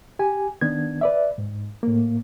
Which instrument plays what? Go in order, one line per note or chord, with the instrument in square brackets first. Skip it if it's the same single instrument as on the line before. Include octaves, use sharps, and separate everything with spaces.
[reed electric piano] G4 G#5
D#3 B3 D4 G#6
B4 D5 E5
G#2
A2 A#3